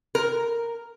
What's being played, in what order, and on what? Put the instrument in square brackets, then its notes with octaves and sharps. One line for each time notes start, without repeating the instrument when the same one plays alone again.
[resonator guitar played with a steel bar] A#4